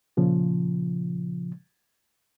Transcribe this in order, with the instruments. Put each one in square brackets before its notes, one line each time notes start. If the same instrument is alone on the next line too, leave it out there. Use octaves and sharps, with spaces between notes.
[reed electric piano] A#2 C#3 F3